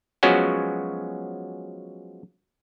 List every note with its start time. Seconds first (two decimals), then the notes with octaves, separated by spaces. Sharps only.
0.23 F3 F#3 G#3 B3 C#4 F#4